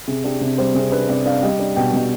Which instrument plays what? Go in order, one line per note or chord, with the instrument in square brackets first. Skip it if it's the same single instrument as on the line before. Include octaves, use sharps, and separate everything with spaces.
[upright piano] C3 G#4
D4 G4
C3
G3 C5
C3 G#4
D4 B4
C3 D5
D4 F5
G3 D#5
D4
B2 G5
B2